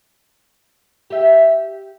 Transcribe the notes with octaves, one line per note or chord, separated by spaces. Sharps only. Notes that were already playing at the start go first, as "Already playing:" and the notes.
G4 E5